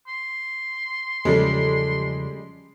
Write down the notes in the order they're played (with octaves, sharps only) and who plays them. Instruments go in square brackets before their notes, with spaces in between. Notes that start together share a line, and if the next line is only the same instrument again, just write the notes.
[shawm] C6
[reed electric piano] E2 C#3 F3 [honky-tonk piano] G3 G#3 [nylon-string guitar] C#4 A4